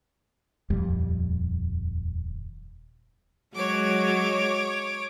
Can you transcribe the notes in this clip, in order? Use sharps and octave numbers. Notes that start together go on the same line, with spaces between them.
D#1 F2 G3
F#3 G#3 C#5 D6